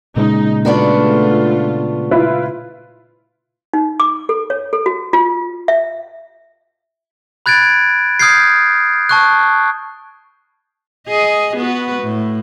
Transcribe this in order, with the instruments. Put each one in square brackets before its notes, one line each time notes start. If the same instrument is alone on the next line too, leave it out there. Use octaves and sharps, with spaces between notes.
[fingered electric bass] A#2 C#3 G#3 [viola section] D#4
[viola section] A3 F4 [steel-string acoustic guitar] B3 D4 F#4
[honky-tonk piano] E4 F4 B4
[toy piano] D#4
D6
A4
C#5
A4
F#4
F4
E5
[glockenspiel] B5 F#6 G#6 A6 D7
D#6 F6 G6 G#6 C7
A5 C#6 F#6
[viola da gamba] G#4 D#5
B3 F#4 B4
A2